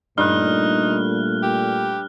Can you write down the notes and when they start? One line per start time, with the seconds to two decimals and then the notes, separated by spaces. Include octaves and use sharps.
0.18 G2 A#2 A3 D#4 F6 F#6
1.43 G4